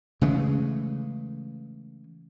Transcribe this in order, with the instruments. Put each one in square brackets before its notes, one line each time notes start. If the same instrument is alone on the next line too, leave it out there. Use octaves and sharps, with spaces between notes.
[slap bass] C#3 E3 G#3 A3